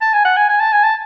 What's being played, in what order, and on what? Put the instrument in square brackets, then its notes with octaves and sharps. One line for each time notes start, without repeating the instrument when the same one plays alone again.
[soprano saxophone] A5
G#5
F#5
G#5
G#5
A5
G#5
A5